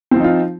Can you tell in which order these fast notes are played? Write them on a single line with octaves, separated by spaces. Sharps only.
C4 F3 D#4 F4